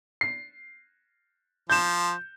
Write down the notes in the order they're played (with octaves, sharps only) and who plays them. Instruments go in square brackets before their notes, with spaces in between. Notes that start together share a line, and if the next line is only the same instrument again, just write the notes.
[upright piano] C7
[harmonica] F3 [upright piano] G6 E7